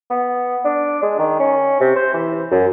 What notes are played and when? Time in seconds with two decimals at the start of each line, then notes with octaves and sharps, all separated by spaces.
0.10 B3
0.64 D4
1.02 G#3
1.19 D#3
1.40 C#4
1.80 C3
1.96 C5
2.14 E3
2.51 F#2